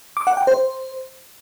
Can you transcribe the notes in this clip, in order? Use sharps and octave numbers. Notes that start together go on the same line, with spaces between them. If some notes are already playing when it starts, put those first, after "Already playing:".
D6
F#5
G5
C5